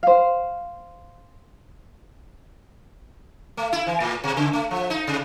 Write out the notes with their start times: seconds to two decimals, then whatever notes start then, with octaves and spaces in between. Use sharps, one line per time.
0.03 C5 F5
3.57 A3
3.73 E4
3.87 E3
4.00 A2
4.24 B2
4.37 C#3
4.53 A3
4.71 F3
4.90 D#4
5.07 C3